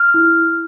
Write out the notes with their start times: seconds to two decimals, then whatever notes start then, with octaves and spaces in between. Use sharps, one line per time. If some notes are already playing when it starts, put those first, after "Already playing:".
Already playing: F6
0.14 E4